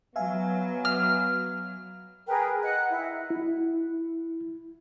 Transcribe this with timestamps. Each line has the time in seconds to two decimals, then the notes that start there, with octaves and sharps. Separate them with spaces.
0.16 F#3 B3 E5 F5 G#5
0.85 F6
2.27 G#4 A#4 B4 G5
2.62 D#5 F#5 F#6
2.90 E4
3.30 E4